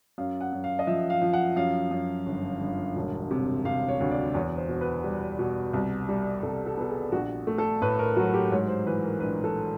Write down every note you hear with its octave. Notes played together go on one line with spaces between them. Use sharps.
F#2 F5
F#5
F#2
F5
D#5
F3 E5
F5
F3
F#5
F#2 F5
F#2
G1
G1
E1
C3
C3 F5
C#5
D2
D5
E2 C#5
C5
B2
B4
G3
B2
C2
G3
C2 A4
A4
B3 A4
G#4
A#1 F#4
A3
A4
A2 B4
A#4
F#3 F#4
G4
G#2 C#5
C5
E3 B4
A#4
A#1 B4
A4